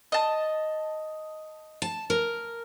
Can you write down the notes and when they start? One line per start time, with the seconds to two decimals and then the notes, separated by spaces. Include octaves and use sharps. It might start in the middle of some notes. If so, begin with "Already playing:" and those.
0.12 D#5 A5
1.82 A5
2.10 A#4